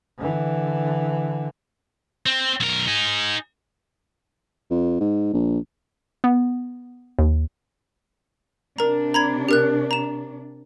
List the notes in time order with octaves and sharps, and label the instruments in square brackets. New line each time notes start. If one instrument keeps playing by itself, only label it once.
[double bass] D3 E3
[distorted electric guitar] C4
B1 A#4
D#4 G#4
[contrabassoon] F2
G#2
A#1
[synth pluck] B3
D#2
[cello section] C3 D4 [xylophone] A#4 A#5
[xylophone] A#5 B5 G#6
G4 A#4 F#6
A#5 E7